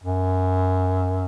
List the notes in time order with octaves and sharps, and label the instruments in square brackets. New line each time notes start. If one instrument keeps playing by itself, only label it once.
[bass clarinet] F#2